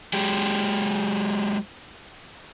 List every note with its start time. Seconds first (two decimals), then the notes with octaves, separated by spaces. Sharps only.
0.13 F#3 G#3 G4